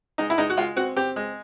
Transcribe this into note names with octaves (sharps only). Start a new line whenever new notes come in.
G#3 D#4
E4
G#3 D#4
F#4
G#3 F4
C4 F#4
C4 G4
G#3